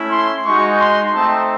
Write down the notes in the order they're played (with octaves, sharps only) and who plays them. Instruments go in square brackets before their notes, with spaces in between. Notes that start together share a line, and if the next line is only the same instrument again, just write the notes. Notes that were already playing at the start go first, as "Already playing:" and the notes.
Already playing: [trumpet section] A3 C#4 E4
C6
G#3 D#4 F#4 C#6
C6
A3 C4 D#4 A5